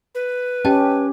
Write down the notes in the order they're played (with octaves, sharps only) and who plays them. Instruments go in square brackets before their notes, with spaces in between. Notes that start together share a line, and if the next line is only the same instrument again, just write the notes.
[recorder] B4
[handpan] C#4 G4 [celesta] D#5 G5 A5